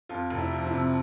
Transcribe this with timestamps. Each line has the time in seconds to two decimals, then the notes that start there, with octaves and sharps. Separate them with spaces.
0.09 F2 F4
0.30 F1
0.39 E4
0.53 F3
0.67 E4
0.74 C3